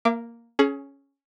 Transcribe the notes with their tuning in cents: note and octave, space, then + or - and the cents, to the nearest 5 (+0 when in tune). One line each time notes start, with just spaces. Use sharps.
A#3 +0 F5 -45 D6 +0
C#4 +0 G#4 +30